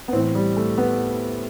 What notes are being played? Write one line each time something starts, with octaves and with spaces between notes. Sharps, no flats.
B3
A2 E3 C4
G3
A3
B3